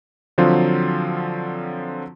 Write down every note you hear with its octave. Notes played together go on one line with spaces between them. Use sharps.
D3 F3 F#3 C4 F4